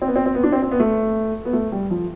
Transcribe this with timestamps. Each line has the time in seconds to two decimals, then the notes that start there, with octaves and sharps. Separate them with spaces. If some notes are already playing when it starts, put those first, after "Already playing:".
0.02 C4
0.07 B3
0.16 C4
0.26 C4
0.35 B3
0.44 D4
0.52 C4
0.63 C4
0.71 B3
0.80 A3
1.45 B3
1.53 A3
1.72 G3
1.91 F3